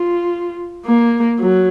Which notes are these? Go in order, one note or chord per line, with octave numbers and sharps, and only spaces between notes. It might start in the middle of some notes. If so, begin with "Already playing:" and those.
Already playing: F4
A#3
F#3